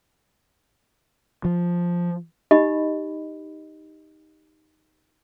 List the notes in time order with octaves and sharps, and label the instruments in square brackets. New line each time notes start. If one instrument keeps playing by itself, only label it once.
[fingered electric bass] F3
[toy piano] D#4 G4 D#5 B5